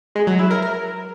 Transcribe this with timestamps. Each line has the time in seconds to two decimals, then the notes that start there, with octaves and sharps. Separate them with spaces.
0.15 G#3
0.27 F#3
0.39 E4
0.51 A#4
0.62 A#4